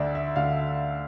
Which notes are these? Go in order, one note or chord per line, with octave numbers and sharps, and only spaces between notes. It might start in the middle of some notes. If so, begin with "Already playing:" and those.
Already playing: D2 D3 D5 E5
E5
D2 D3 F5